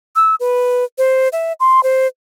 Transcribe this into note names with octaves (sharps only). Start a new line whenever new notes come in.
E6
B4
C5
E5
C6
C5